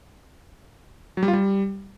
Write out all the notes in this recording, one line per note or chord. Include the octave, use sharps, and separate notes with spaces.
F#3
G3
F4
G3